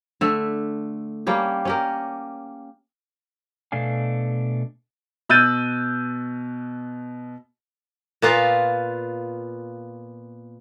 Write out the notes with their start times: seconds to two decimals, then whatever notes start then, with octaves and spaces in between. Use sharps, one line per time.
0.21 D3 A3 E5
1.27 G3 A#3 C#4 G4
1.65 C#4 G4 A#4
3.72 B2 A3 D4 F5 G#5
5.29 B2 E6 F#6 G6 A6 D#7
8.22 A#2 B3 F4